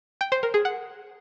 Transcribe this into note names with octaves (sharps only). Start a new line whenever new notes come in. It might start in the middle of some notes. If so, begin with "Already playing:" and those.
G5
C5
A#4
G#4
F#5